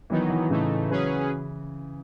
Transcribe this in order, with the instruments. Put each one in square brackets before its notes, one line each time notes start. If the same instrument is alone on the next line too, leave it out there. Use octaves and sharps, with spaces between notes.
[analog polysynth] D#3 F#3 B3 D#4 [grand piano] E3
[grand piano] E3
[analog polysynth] A2 E3 A3 D#4 [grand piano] C#3
[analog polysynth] F#3 C#4 G#4 B4